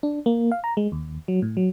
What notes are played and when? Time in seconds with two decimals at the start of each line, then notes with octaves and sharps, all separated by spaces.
0.03 D4
0.26 A#3
0.52 F5
0.64 A#5
0.77 G#3
0.92 D#2
1.28 F#3
1.42 A2
1.57 F#3